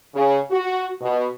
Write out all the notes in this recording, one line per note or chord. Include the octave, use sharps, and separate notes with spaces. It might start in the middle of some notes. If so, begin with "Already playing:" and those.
C#3
F#4
B2